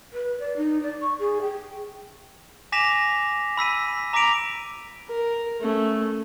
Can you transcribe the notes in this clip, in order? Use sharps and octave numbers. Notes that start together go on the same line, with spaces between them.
B4
D5
D#4
D5
C#6
G#4
G5
G#5 D6 A#6 B6 E7 F7
B5 E6 B6 D#7
A#5 D6 A#6 B6 D7 F7
A#4
A3 C#4